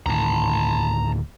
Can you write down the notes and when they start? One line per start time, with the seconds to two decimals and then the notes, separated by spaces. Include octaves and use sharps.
0.06 D2 A2 D#3 A5 A#5